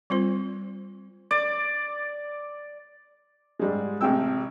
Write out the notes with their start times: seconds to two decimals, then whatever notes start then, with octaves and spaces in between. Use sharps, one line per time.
0.10 G3 C4 F4 C5
1.31 D5
3.59 G#2 G3 G#3
4.01 A1 C3 G#3 G5 E6